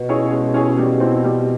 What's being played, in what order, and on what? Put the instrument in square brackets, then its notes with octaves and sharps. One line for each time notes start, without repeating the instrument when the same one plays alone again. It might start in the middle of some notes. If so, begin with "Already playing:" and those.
Already playing: [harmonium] B2
[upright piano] C#4 E4 G#4 C#5
G#3
C#4 E4 G#4 C#5
G3
C4 E4
G3